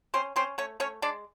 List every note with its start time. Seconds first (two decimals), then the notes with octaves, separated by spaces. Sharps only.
0.14 C4 C#4 C5
0.36 C4 C#4 C5
0.58 A3 C#4 C#5
0.80 A3 C#4 C#5
1.02 G#3 D4 D5